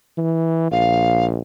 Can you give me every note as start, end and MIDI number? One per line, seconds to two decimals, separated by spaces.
0.17 0.68 52
0.71 1.40 34
0.71 1.25 77